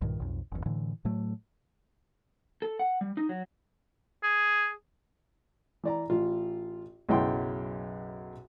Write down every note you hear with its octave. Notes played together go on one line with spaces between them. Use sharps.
B1 G2 A#2 D#3
B1 F2
F#1 E2
A2 D3 E3
A2 F#3 A3
A4
F#5
G3
D#4
F#3
G#4
E3 D5 A#5
A1 F4
B1 F#2 C#3 E4 G5 C6